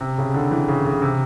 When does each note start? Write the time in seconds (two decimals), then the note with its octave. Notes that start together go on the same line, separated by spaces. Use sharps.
0.01 C3
0.18 C#3
0.34 D3
0.51 E3
0.68 C#3
0.86 C#3
1.02 C3